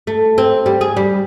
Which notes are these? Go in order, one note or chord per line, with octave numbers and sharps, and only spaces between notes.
A3
C4
G3
G#4
G3